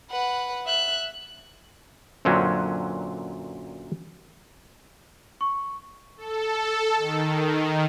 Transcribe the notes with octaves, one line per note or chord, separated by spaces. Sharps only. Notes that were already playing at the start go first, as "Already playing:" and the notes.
B4 F#5
E5 F#6
F#2 A#2 D3 F#3 C4 C#4
C#6
A4
D#3